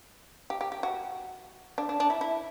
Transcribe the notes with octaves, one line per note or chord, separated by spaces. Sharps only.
G4
G4
G4
F#4
D4
D4
D4
E4
E4